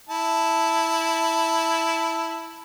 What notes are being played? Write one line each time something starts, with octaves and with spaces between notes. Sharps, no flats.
E4 A5